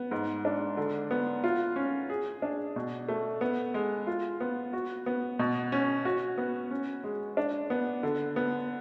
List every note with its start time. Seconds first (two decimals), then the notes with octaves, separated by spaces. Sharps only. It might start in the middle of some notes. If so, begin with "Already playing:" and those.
Already playing: B3
0.11 G#2
0.45 D4
0.77 D3
1.11 B3
1.44 F4
1.76 C#4
2.10 G#4
2.42 D4
2.76 B2
3.09 A3
3.41 B3
3.74 G#3
4.07 F4
4.40 B3
4.73 F#4
5.06 B3
5.39 B2
5.72 C#4
6.05 F#4
6.38 B3
6.71 C#4
7.04 G#3
7.37 D4
7.70 B3
8.03 D3
8.36 B3